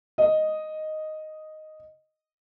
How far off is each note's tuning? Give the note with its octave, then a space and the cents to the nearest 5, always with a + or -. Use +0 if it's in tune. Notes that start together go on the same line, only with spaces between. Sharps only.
D#5 +0